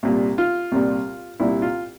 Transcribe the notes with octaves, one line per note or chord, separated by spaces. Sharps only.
C2 A#2 G3
F4
C2 A#2 G3
C2 A#2 G3 E4
F4